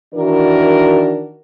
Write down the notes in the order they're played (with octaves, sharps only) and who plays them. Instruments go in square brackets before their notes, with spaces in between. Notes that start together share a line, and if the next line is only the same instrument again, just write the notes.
[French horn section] D#3 E3 D4 F#4 A#4